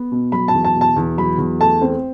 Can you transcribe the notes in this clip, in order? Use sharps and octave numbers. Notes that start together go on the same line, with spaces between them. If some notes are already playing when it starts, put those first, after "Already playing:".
Already playing: B3
B2
F#3 B5
A5
E2
A5
B2
A5
E2
F#3 B5
E2
A3 A5
C4